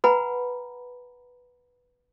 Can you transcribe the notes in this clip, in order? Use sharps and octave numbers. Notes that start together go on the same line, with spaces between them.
B4 F#5 G#5 A#5 B5